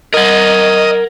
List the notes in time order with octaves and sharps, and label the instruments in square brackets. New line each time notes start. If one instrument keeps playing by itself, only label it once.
[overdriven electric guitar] A#4 F#5 [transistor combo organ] D#5